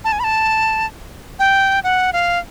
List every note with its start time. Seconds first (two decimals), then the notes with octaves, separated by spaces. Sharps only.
0.04 A5
0.12 G#5
0.20 B5
0.24 A5
1.39 G5
1.84 F#5
2.13 F5